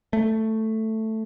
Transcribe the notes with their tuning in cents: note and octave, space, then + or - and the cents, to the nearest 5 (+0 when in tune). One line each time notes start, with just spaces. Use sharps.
A3 +5